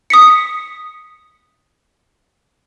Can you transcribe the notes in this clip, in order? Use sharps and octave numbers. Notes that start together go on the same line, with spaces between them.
D#6 B6 C#7